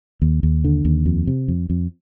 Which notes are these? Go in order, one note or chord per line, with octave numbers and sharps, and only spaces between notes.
D#2
D#2
D3
D#2
F2
C3
F2
F2